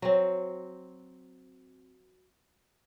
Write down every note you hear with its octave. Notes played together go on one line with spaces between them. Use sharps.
F#3 C4